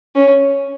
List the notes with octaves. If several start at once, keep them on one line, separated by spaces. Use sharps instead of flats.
C#4